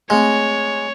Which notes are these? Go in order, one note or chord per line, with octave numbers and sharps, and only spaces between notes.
G#3 A3 C4 C#5